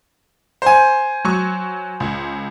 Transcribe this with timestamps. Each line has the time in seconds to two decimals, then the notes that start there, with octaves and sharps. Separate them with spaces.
0.62 C5 G#5
1.25 F#3 C#6
2.00 C#2